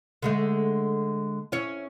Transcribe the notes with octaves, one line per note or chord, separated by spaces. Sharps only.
D3 G#3 A3
C#4 E4 C#5